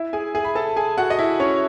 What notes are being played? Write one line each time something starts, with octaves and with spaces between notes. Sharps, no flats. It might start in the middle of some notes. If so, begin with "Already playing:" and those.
Already playing: E4 E5
G#4 G#5
G#4 G#5
B5
A4 A5
G#4 G#5
F#4 F#5
D#5
E4 E5
C#4 C#5